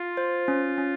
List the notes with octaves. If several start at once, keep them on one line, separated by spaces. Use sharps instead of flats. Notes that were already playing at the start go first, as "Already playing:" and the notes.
Already playing: F4
C5
C#4
C#4